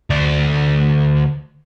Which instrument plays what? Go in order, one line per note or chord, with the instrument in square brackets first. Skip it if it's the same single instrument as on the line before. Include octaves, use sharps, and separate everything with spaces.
[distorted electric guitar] D2 D5